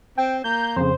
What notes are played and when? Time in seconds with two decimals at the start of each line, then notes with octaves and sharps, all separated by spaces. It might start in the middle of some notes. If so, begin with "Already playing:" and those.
0.18 C4 G5
0.44 A#3 G6
0.76 F2 C#3 C5